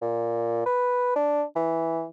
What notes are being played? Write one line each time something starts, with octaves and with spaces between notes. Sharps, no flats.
A#2
B4
D4
E3